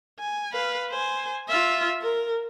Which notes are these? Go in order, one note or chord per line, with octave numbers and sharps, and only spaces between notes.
G#5
B4 F5
C5 G#5
F4 E5
A#4